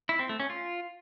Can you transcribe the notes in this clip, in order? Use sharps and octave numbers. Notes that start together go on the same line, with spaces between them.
E4
C4
A3
C#4
F4